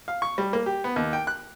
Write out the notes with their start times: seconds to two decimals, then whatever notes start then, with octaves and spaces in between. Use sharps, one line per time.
0.08 F5
0.22 C#6
0.38 G3
0.53 A#3
0.66 G4
0.84 B3
0.96 D#2
1.13 G5
1.27 F#6